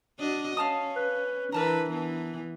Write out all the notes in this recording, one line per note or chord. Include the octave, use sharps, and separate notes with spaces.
D4 F#4 D#5
C#4 F5 A5 D#6
B4
E3 D4 A#4 B4 A5 A#5
E3 B3